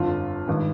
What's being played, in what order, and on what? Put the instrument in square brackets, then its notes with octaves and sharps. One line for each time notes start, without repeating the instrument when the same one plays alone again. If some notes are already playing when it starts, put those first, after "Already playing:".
Already playing: [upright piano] G1 F2 D3 F4
G#1 G2 D#3